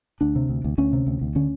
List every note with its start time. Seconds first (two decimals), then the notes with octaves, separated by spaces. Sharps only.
0.21 D2 D4
0.36 C3
0.49 D2
0.64 D2
0.78 D2 C#4
0.93 C3
1.07 D2
1.21 D2
1.36 D3 C#4